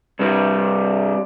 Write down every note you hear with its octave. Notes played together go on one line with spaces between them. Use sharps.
G2 C3 G3